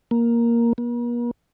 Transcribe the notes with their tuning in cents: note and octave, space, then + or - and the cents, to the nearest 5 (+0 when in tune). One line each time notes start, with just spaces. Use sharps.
A#3 +5
A#3 +45